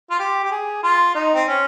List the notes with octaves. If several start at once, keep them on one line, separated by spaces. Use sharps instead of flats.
F4
G4
G4
G#4
F4
D#4
C4
C#4